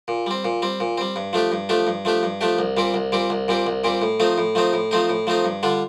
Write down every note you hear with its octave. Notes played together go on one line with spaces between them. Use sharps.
A#2
G3 C4
A#2
G3 C4
A#2
G3 C4
G2
F3 A3 D4 G4
G2
F3 A3 D4 G4
G2
F3 A3 D4 G4
G2
F3 A3 D4 G4
C2
A#2 G3 C4 G4
C2
A#2 G3 C4 G4
C2
A#2 G3 C4 G4
C2
A#2 G3 C4 G4
A2
F3 A3 C4 D#4
A2
F3 A3 C4 D#4
A2
F3 A3 C4 D#4
A2
F3 A3 C4 D#4
G2
D3 G3 D4 F4